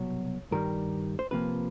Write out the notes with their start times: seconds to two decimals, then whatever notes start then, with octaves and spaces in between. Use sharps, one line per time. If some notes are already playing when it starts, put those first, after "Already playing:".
Already playing: C2 B2 F#3 C#5
0.51 G2 D#3 G3 A#4
1.19 C5
1.31 C3 F3 A#3 B4